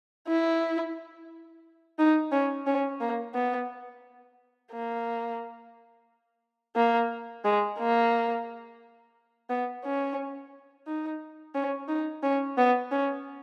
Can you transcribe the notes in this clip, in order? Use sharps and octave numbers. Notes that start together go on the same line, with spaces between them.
E4
D#4
C#4
C#4
A#3
B3
A#3
A#3
G#3
A#3
B3
C#4
D#4
C#4
D#4
C#4
B3
C#4